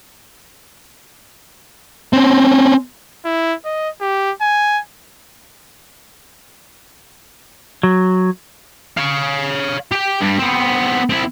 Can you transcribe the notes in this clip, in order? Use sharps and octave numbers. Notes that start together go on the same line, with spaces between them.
C4 C#4
E4
D#5
G4
G#5
F#3
C#5 F5
G4 G5
G2 G3
B3 C4
C4 E4